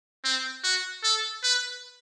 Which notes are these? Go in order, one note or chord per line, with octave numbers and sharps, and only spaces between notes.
C4
F#4
A4
B4